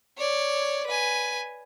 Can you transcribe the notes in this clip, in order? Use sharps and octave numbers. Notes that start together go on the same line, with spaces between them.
C#5 D5
B4 G#5